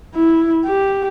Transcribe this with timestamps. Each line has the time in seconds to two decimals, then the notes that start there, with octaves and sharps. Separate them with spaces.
0.15 E4
0.66 G4